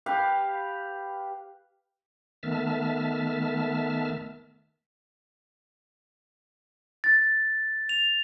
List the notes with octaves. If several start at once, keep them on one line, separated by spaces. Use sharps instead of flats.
G4 B4 F5
D#3 A3 B3 E5 A5 F6
A6
F7